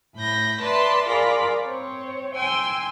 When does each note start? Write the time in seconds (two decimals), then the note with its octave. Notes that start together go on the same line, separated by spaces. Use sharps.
0.15 A2 B5 G6 A#6
0.61 B4 D5 E5 A5 B5 C6
1.07 F4 G#4 A#4 D5 A#5 B5
1.64 C4 C#5
2.35 G5 G#5 C6 E6